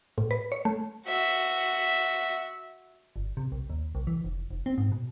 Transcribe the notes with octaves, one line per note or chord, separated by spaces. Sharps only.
A2
B4
C#5
A3
F#4 E5
G1
C3
C2
D#2
C2
E3
F1
F1
C4
G#2
B2